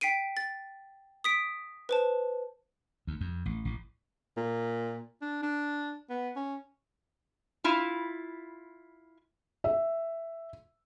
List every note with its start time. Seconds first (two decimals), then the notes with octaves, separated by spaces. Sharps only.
0.01 G5 B6 C7 D7 D#7
0.37 A6
1.24 D#6 B6 D7
1.89 B4 C5 A5
3.07 D2
3.21 F2
3.46 A1
3.65 A1
4.37 A#2
5.22 D4
5.43 D4
6.10 B3
6.36 C#4
7.64 E4 F4
9.64 E5